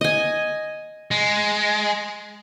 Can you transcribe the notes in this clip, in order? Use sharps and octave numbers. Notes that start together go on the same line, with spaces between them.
D#5 G#5
G#3